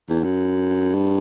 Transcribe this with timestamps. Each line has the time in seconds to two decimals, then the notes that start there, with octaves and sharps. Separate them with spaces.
0.10 E2
0.24 F#2
0.94 G2